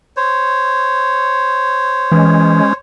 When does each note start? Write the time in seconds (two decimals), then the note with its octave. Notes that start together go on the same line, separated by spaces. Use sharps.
0.17 C5 C#5
2.12 E3 G#3 C#4